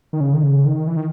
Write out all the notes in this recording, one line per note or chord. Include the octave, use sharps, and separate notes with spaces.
D#3
C#3
D#3
C#3
D#3
E3
D#3